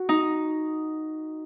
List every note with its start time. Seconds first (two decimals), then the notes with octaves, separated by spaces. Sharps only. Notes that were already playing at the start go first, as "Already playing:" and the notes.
Already playing: F#4
0.09 D#4